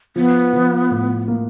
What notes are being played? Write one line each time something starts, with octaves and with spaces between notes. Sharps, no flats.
F3 B3
F3
A2
A#3